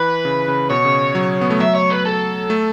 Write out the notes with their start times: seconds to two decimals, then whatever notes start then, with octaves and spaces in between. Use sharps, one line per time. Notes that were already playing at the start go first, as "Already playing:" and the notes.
Already playing: E3 B4
0.25 C#3
0.48 C#3
0.70 B2 C#5
0.85 C#3
1.15 F#3
1.41 B3
1.50 A3
1.60 F#3 E5
1.75 C#5
1.90 B4
2.05 A4
2.50 A3